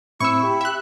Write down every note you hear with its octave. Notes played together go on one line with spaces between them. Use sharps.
A2 C4 E4 C#6 E6
G4 G5 B5
E5 F#6